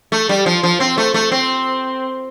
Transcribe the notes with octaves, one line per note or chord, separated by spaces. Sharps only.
A3
G3
F3
F3
C4
A3
A3
C4